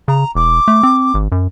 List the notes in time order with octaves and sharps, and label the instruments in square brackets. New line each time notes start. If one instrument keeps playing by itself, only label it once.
[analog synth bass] C#3 [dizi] A#5
[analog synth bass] E1 [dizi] D6
[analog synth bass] A3
C4
G#1
F#2